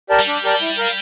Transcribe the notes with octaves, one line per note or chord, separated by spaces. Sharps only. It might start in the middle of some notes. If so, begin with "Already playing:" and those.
G4 A#4 D5 A5
G3
D4
G4 A#4 D5 A5
E4
A#4 F5